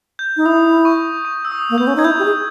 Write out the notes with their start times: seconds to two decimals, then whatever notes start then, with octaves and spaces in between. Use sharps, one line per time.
0.19 G6
0.37 D#4
0.46 E4 D#6
0.85 C#6
1.25 C#6
1.45 E6
1.51 D#6
1.70 A#3
1.78 B3 G6
1.87 C#4
1.96 D#4 G#6
2.04 E4 G6
2.19 G4
2.25 G#4